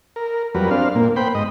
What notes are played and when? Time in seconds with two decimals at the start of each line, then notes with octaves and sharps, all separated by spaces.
0.16 A#4
0.55 F2 F#3 G3 A#4 B4
0.71 C4 D4 F5
0.95 A#2 A#3
1.16 B3 C5 G5 B5
1.35 G#2 D#5